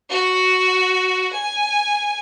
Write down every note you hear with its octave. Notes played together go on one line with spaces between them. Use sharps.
F#4
G#5